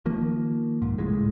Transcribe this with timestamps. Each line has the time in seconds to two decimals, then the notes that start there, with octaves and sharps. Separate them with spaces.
0.06 D#3 F3 A#3
0.82 B1 G#2
0.98 D#1 C#2 A2 G#3